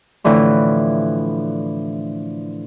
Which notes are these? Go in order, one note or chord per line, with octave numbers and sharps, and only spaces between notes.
A2 D3 E3 F3